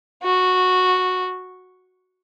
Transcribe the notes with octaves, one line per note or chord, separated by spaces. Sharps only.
F#4